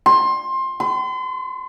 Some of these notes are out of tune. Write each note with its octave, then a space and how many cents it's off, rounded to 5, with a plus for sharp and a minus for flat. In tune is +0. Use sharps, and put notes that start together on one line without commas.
C6 +20
C6 -40